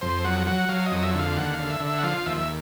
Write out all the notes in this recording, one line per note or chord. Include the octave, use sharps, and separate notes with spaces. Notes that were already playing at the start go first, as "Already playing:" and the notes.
F2 C5
F#3 F#5
F#3 F#5
F#3 F5
D#5
F2
E5
D3 E5 F5
D#2 F#5
F5
D3
E5
D3
E5
F#5
F3 F5
D#2 E5
E5